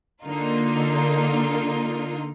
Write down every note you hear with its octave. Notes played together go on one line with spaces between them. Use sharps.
D3 A#3 D#4 F4